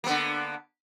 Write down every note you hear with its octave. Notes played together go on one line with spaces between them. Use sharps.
D3 A#3 B3